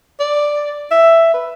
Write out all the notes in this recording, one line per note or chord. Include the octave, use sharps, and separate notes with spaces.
D5
E5
B4